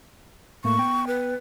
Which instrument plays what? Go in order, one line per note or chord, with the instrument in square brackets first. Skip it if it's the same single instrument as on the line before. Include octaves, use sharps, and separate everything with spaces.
[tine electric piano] A2 A3 A#3 [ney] C#6
[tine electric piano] B3 G5
[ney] B4